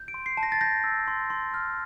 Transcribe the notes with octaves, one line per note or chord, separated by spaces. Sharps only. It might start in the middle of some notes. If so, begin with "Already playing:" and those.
Already playing: G6
D7
C6
C7
A5
A#6
A6
G6 A#6
E6
C6
C6
F6